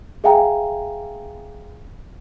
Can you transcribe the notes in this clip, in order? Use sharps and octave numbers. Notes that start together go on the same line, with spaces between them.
G#4 E5 F5 G5 G#5 A#5